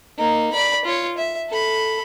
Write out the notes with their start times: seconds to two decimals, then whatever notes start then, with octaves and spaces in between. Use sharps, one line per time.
0.18 A#3 D#4
0.53 D5 B5
0.85 F4 C#5
1.18 E5
1.49 A4 B5